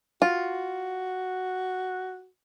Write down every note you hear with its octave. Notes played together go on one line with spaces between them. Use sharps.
F4 F#4